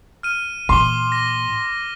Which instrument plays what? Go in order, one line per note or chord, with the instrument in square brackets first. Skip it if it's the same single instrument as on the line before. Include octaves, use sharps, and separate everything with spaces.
[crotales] F6 D#7
[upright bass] A#2 E3 [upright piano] C6 [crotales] D6 G7
[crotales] A#6